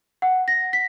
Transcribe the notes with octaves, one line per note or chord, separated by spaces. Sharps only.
F#5
A#6
B6